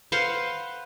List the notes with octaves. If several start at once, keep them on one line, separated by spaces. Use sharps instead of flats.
B4 C5 F5 F#5